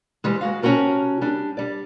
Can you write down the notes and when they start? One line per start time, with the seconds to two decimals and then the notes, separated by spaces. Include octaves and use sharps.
0.24 E3 G3 G#3
0.41 G#3 F#4 F5
0.62 C3 C#4 F4 F#4 A#4 A5
1.21 G3 D4
1.57 G3 D5